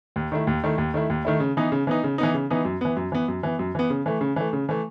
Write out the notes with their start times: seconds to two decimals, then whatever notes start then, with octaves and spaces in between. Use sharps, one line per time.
0.16 D#2
0.32 D#3 A3 E4
0.47 D#2
0.63 D#3 A3 E4
0.78 D#2
0.94 D#3 A3 E4
1.10 D#2
1.25 D#3 A3 E4
1.40 C#3
1.57 E3 B3 D#4
1.72 C#3
1.87 E3 B3 D#4
2.04 C#3
2.18 E3 B3 D#4
2.34 C#3
2.50 E3 B3 D#4
2.65 F#2
2.81 E3 B3
2.97 F#2
3.12 E3 B3
3.28 F#2
3.43 E3 B3
3.59 F#2
3.75 E3 B3
3.90 C#3
4.06 E3 A3
4.21 C#3
4.36 E3 A3
4.53 C#3
4.69 E3 A3